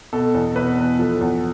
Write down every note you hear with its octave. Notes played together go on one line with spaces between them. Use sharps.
B2 A4
E2
B2 B4
E2
F3 A4
E2